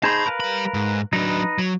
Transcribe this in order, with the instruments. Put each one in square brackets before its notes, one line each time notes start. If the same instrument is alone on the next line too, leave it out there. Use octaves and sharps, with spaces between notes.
[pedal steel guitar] D#4 G#4 C5 [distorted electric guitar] A5 B5
[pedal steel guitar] A#4 B4 F5
[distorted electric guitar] G3 B5
G#2
[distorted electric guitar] F#3 D4 [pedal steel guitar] D#4 B4
[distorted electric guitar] F#3